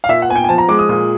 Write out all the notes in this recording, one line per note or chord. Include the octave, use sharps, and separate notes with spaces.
F5
A#2 E5
F#5
B3 G#5
G5
G#5
F3 A5
A#5
G#3 D6
D#6
A#2 D#6